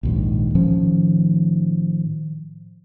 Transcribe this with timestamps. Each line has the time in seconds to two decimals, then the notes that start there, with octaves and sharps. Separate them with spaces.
0.03 A#1 D#2 G#2
0.55 A2 D#3 F3 C#4